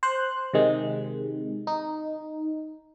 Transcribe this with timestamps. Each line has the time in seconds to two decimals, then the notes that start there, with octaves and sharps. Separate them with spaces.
0.03 C5 F#6
0.54 C3 D#3 G#3
1.67 D#4